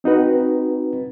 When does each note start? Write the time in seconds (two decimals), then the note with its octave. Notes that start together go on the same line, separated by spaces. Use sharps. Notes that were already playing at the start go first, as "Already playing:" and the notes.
0.04 C4 D#4 F#4 B4